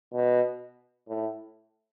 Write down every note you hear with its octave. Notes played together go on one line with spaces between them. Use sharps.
B2
A2